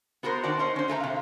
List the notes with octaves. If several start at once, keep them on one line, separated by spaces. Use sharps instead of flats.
B3 F#4 A4 A#4 C5
D#3 D4 F#4 C5 D5 A5
C#4 C5 D#5
C#4 C5
D3 A3 A5 A#5
C3 F5